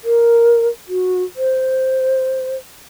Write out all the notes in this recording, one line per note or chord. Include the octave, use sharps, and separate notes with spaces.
A#4
F#4
C5